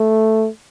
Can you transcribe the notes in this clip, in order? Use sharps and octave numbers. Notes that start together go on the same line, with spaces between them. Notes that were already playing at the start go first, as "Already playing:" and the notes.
Already playing: A3